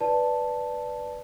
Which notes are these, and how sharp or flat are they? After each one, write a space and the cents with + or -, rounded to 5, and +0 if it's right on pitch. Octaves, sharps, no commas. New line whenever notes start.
B4 +0 D5 +0 A5 +0